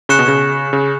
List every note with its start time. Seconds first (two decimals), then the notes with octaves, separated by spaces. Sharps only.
0.09 C#3 C#6 F#6 C#7 E7
0.19 B2
0.28 C#3
0.73 C#3